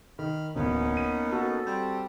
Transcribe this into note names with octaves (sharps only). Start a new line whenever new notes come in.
D#3 B5 F6
D1 E2 A#3 B3 C#4 D#4
D#7
F#4 A4
G3 C4